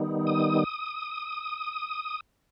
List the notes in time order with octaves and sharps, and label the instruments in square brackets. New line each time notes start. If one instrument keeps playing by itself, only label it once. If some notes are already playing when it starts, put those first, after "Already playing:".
Already playing: [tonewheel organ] D#3 G3 B3 D#4
D#6